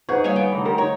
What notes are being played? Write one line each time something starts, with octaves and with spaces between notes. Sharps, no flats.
D#4 G#4 B4 C5 F#5 C#6
G3 A#3 C#5 F5 G#5
B3 G5
D3 E3 A3 D#4
G#2 G4 A#4
D#4 C#5